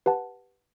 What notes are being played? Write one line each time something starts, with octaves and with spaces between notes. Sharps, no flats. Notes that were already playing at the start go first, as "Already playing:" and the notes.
G4 B4 F#5 A5